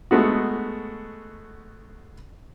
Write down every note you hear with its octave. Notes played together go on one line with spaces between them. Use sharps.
G#3 A3 B3 F#4